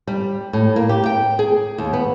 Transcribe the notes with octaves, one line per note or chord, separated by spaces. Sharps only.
G3
A2
A#3
G4
G5
G#4
D#2
B3